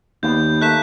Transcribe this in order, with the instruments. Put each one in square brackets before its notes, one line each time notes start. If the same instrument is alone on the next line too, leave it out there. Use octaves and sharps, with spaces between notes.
[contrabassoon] D#2 [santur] B3 D5 F5 [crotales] G6
[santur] A3 A#3 [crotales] F#6 B6 E7